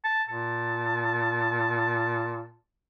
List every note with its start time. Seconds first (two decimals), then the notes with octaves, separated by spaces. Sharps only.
0.04 A5
0.29 A#2 A5